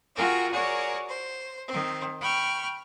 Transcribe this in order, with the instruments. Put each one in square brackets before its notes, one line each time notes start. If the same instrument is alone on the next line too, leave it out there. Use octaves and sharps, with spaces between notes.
[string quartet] F4 F#4 G#4 A#4 G5
F#4 G#4 A#4 C#5 D5
C5
D#3 C4
G5 B5 C#6 F6